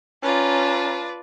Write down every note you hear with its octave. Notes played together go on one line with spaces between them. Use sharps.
C#4 F4 B4 D5 A5 A#5